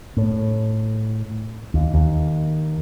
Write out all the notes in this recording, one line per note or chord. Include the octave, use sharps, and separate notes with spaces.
A2
D#2
D#2